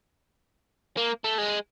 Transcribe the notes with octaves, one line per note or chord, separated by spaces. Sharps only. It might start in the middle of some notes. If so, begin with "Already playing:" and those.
A#3
A3
G#3